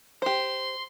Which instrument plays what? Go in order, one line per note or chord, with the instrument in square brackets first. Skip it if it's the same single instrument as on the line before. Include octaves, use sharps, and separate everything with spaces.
[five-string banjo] G4 C5 [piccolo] C6